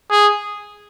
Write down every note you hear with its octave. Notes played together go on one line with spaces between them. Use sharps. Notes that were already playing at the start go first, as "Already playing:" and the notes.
G#4